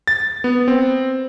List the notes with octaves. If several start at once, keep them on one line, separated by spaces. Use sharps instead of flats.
A6
B3
C4